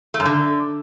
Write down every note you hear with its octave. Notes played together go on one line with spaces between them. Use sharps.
A3
F#2
D3